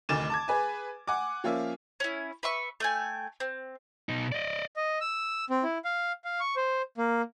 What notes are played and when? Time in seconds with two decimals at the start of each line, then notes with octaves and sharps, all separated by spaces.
0.09 F1 D2 D#3 D6 A6 E7
0.30 A5 D6 G#6
0.48 G#4 B4 G#5
1.07 F#5 G#5 D6
1.44 F3 A#3 C#4 F4 E5 F5
2.00 C#4 E4
2.43 B4 E5 C#6
2.80 A3 G5 G#5
3.40 C4
4.09 B2 D#4
4.32 D5 D#5
4.76 D#5
5.01 E6
5.50 C4
5.63 E4
5.85 F5
6.25 F5
6.40 C#6
6.56 C5
6.98 A#3